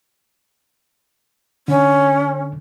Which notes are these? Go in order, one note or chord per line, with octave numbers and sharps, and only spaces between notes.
D3 C#4